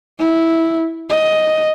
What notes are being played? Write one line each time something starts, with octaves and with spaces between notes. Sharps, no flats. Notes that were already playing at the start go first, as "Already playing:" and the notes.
E4
D#5